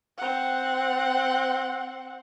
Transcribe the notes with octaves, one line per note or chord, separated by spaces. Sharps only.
C4 F#5